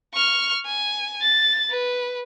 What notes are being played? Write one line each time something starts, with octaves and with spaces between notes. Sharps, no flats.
C#6 F6
G#5
A6
B4